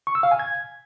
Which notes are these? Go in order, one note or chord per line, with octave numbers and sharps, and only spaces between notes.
C#6
E6
F5
G#5
G#6